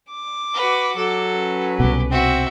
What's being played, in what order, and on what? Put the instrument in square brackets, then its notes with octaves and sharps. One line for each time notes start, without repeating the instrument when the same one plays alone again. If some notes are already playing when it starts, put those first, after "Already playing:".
[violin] D6
[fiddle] F#4 B4
[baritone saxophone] F#3 [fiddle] A4
[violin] C#4 B4
[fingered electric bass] C2 B2 [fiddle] G4
[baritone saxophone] C4 [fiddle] F#4 E5